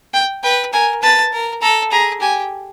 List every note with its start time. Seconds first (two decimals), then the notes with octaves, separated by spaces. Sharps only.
0.14 G5
0.43 B4 G5
0.73 A#4 G#5
1.02 B4 A5
1.32 A#4
1.62 A4 A#5
1.92 G#4 A#5
2.21 G4 G#5